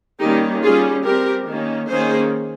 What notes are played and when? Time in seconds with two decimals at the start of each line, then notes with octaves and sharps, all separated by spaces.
0.20 D#3 G3 A#3 C#4 D#4 G4
0.62 G3 C#4 F4 G#4
1.04 G3 C4 G4 A#4
1.47 D#3 A#3 C#4
1.88 D#3 A#3 C#4 G#4 C5